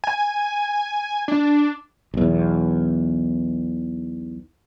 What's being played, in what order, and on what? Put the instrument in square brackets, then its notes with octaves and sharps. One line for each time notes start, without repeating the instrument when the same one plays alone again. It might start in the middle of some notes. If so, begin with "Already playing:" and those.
[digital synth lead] G#5
D4
[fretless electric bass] B1 E2